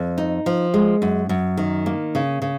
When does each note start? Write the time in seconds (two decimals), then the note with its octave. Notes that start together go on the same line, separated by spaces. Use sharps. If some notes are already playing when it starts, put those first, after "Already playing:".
Already playing: F2
0.18 D#4
0.46 F3
0.74 G#3
1.02 F#2
1.29 F#2
1.57 D#3
1.86 A#3
2.15 C#3
2.42 C#3